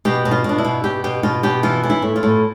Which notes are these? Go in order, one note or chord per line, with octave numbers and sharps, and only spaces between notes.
B2 G4
B2
F4
B2 D4
E4
B2
B2 G4
B2 G4
B2 F4
B2 G4
E3 F4
E3
E4
A2
F4
A2